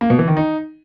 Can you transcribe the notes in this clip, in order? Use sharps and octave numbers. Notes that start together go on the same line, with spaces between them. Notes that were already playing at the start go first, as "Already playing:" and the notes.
A#3
B2
E3
D#3
D#4